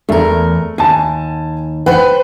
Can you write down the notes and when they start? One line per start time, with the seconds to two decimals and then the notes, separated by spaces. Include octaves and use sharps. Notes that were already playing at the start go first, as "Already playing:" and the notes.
0.09 E2 A3 A#4
0.78 D#2 G#5 A5
1.86 B4 C5 F#5 G5